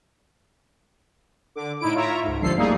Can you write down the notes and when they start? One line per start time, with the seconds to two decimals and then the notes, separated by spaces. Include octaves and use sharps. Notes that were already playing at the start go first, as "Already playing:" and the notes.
1.55 D3 D6
1.80 A2 D#4 E4 D7
1.94 F4 C#5 E5 A#5
2.23 C#2 G#2
2.42 G1 C2 D3 F3 A4 C7
2.56 G3 A3 A#3 D#4 G#4